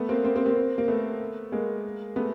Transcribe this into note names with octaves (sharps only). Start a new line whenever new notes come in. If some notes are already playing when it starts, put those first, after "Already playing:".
Already playing: A3 B3
A#3 C4
A#3 C4
A#3 C4
A#3 C4
A#3
A3 B3
G#3 A#3
A3 B3